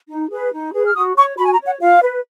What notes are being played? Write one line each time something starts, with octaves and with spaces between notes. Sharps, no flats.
D#4
G#4 B4
D#4
G#4 B4
F6
F#4 D#6
C#5 C#6
F#4 B5
G#5
A#5
C#5
F#5
F4 F5
B4